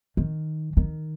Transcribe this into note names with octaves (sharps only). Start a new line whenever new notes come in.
D#3
D#3